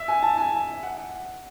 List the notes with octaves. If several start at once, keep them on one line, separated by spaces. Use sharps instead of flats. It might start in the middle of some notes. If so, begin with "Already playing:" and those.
Already playing: E5
G#5
A5
G#5
F#5